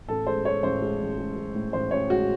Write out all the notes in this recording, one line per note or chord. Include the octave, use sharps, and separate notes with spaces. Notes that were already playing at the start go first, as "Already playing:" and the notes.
A1 A4
G#3 C5
G#3 C#5
A1 C5
G#3
A1
G#3
G#3
A2
A1 C5
A1 C#5
G#3 F#4